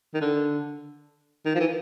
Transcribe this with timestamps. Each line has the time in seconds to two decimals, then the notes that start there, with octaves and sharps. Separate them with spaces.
0.14 D#3
0.21 D3
1.46 D#3
1.55 F3
1.60 E3